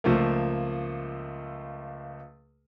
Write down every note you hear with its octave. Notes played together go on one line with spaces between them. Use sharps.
C#2 F3 A3 A#3